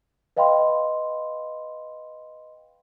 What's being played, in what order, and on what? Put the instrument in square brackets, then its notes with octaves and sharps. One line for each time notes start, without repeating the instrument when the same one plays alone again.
[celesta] B4 D#5 F5 G5 B5 C6